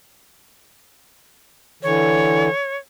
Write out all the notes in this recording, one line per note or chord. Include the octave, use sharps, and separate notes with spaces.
D3 E3 C#5